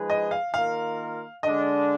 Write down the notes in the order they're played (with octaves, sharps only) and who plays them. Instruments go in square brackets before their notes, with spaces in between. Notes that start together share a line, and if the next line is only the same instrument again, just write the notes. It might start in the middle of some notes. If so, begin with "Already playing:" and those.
Already playing: [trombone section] F3 G#3 D#4 G#4 B4
[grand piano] D#5
F5
[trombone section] D#3 A#3 F4 A#4 [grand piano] F5
[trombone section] D3 G#3 D4 [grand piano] D#5